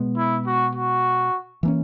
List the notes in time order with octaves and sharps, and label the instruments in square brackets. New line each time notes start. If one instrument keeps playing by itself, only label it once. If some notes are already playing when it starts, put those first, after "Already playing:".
Already playing: [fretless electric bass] B2 G#3 B3
[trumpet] E4
F#4
F#4
[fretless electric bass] E3 A#3 C#4